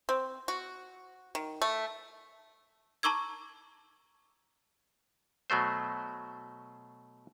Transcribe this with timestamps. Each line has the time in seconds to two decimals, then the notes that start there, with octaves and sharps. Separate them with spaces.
0.09 C4
0.48 F#4
1.35 D#3
1.62 A3
3.03 A5 A#5 C#6 D6 E6 G#6
5.50 B2 F#3 A3 C5